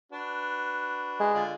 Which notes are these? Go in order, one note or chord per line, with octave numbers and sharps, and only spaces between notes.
D4 F#4 B4
G#3
D3 F4 D5